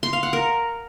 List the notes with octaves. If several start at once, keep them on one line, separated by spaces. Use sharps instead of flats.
C6
F5
F#5
A#4